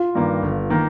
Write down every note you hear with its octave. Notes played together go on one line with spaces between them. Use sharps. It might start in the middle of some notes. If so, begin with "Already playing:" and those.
Already playing: F4
G2 D#3 A#3
G1
D#3 A#3